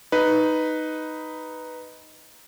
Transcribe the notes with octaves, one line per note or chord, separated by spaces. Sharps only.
D#4 B4